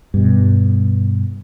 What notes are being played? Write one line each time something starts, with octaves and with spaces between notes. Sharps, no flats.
G2 B2